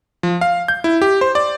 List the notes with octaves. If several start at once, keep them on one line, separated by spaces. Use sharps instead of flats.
F3
F5
G6
E4
G4
C5
D5